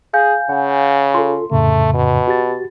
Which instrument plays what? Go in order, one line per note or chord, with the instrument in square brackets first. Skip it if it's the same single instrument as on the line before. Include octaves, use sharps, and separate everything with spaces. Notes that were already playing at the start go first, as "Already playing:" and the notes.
[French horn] G#4 [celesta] F5 G#5 G6
[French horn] C#3 [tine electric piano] F#5
[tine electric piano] F4 A4 [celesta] C6
[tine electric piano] F2 A2 C#3 [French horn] A3
[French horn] B2
[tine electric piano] F#4 G4 A6